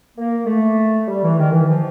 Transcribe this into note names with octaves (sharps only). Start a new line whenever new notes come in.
A#3
A3
G3
E3
D#3
E3
F3